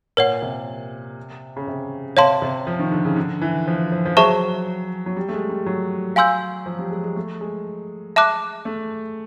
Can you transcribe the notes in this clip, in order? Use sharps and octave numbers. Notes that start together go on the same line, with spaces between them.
A#2 A#4 C#5 F#5
C3
C#3
C3
C3 C#5 F5 A5 C6
C3
F3
D#3
D3
C#3
D3
E3
F3
F3
F3
F#3 G#4 C5 E5 A5 C#6
F#3
G3
A3
G#3
G3
F#3
F5 G#5 C6 E6 G6
F3
G3
G#3
G#3
A3
G#3
E5 A5 D6 F#6
A3